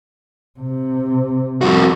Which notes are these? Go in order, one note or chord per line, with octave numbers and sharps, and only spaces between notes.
C3
F2 F#4